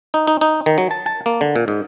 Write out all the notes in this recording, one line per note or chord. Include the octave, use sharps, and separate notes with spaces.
D#4
D#4
D#4
D#3
F#3
A5
A5
A#3
D3
A#2
G#2